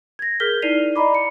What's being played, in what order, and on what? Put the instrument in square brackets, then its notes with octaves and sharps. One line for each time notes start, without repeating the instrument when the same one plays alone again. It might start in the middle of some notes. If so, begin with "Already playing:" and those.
[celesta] G#6 A#6
G#4 A#4 F6 G6 B6 G7
D#4 E4 D5 C7 D#7 F7
D5 D#5 A#5 B5 D6
C#7